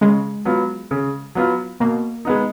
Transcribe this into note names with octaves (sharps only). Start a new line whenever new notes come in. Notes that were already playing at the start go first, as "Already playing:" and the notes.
C#3 G#3
F#3 B3 F4
C#3
F#3 B3 F4
B2 A#3
G#3 B3 D#4